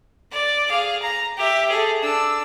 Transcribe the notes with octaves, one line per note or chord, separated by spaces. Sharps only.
D5
G#4 F5
A#5
G4 E5
G#4 A4
D4 E6